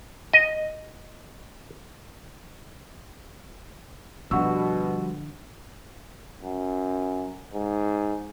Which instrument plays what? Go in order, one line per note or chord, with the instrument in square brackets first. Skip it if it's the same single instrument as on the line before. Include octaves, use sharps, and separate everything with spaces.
[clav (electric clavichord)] D#5
[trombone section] B2 [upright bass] D3 [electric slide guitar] F3 G3 F#4 [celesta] F#5 C#6 E6
[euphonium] F#2
G#2